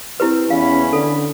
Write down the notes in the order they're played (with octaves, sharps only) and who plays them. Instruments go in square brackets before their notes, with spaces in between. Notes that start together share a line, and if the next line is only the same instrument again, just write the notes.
[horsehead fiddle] C4 [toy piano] E4 G4 B4
[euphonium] E2 [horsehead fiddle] C#4 B5 [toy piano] F5
[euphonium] D3 [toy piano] A4